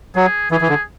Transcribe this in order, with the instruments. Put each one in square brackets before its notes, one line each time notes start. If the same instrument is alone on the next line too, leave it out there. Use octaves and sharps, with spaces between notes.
[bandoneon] F#3 [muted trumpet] G#4
[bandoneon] E3 [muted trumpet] G#4
[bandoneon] E3
D3